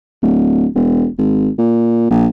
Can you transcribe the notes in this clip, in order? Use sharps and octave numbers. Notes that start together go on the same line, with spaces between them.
D1
E1
G#1
A#2
A#1